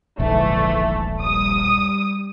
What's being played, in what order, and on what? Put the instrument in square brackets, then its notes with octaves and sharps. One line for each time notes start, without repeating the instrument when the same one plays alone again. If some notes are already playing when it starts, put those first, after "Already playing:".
[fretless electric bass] D#1 A#1 [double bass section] G#2 D3 E3 [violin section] A3
[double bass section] G3 [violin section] D#6